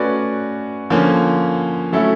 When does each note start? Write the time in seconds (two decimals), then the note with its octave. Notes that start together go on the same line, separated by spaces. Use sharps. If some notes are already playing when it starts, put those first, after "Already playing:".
Already playing: A3 C#4 F#4 B4 D5
0.90 D3 F3 A#3 C#4
1.93 F#3 A3 C#4 E4 A4